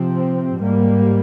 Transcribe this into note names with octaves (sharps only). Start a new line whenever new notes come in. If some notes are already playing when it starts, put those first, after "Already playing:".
Already playing: C3 F3 C4
G#2 G3 A#3